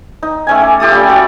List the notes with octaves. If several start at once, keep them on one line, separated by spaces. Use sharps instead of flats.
D#4
A3 C#4 G#5
A3 D6
F4 G4 A4 D#6
G3 A3 C#4
F#4 A4 D5